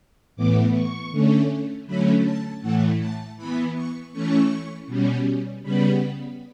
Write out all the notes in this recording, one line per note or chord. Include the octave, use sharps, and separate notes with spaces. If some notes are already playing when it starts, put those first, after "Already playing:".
A2 E3 B3 D6
C#6
D3 A3 C#4
D3 F#3 A3 C#4 B5
A5
A2 E3 A3 F#5
A5
E3 B3 B5
C#6
E3 A3 C#4 C#6
B2 G3 C#4
C#3 G3 B3 B5